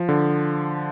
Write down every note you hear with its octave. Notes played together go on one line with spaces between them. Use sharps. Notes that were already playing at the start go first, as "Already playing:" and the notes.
Already playing: F3
D3